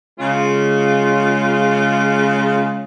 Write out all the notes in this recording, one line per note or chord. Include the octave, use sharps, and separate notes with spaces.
C#3 G#3 C#4 F4